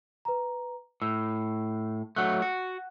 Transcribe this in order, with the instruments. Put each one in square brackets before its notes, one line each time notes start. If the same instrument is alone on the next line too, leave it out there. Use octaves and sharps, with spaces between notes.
[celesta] B4 A#5
[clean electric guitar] A2 [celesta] E6
[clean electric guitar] F#3 A3 [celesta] F#5 F#6
[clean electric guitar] F#4